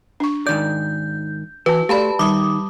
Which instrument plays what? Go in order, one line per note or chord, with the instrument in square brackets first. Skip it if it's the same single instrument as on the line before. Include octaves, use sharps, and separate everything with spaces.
[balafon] D4 C#6
[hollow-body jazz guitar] G#2 D#3 D5 [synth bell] G6
[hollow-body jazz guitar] E3 [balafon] F#4 A5 [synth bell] B4
[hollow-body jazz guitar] A3 [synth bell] G4 A5 B5 [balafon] D5 F5
[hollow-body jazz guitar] D#3 [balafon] G3 [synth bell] D6 D#6